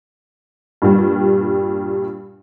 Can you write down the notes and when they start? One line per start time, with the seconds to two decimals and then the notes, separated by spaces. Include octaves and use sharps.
0.82 G2 A#2 G3